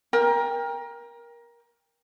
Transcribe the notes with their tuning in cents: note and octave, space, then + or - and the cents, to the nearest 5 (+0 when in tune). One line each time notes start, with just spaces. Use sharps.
A#4 +20 G5 +25